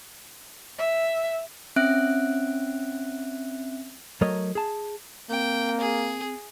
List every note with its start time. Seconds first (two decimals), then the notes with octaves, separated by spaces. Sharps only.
0.78 E5
1.76 C4 C#4 E5 F#6 D7
4.21 F#3 A3 A#4 C#5 D#5
4.55 G#4 A5
5.30 A#3 C4 G5
5.81 G#4